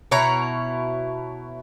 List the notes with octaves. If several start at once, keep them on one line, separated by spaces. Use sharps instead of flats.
B2 E4 C#5 A#5